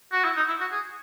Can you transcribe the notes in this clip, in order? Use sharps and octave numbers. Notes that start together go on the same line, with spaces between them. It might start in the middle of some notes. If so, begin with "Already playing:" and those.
F#4
E4
D#4
E4
F#4
G#4